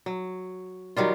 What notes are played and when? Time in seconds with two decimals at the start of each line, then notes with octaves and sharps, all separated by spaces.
0.06 F#3
0.97 D#3 F#3 G3 F4